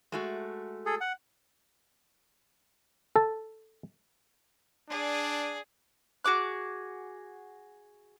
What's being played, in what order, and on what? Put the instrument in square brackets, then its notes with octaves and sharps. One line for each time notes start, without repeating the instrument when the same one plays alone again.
[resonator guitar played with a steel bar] G#3 A3 F#4
[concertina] G#4 A4
F#5
[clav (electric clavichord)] A4 A5
[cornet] D4 [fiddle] G#4 D5
[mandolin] F#4 G#4 D6 F#6